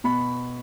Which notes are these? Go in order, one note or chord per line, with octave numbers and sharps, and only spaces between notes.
B2 B5